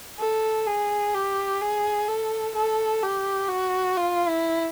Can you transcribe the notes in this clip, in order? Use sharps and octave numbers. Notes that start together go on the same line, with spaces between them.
A4
G#4
G4
G#4
A4
A4
G4
F#4
F4
E4